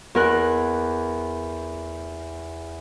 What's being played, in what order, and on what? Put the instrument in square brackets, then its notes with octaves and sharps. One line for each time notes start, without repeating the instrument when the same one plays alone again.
[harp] E2 A#4 F#6